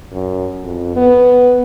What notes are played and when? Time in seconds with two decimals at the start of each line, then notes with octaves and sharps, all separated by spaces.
0.13 F#2
0.63 F2
0.96 B3